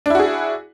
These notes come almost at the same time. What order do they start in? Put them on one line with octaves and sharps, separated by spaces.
D4 E4 F#4 G#4